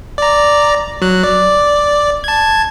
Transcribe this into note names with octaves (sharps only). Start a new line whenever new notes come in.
D5 A#5
F#3 F#6
D5
A5 G#6